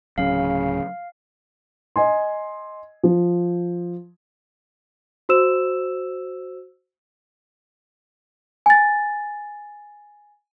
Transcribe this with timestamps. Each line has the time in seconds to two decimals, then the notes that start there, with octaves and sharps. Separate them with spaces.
0.18 D1 C#3 F#3 C#4 F5
1.96 D#5 G#5 C6
3.04 F3
5.29 F#4 C5 E6 E7
8.66 G#5 A6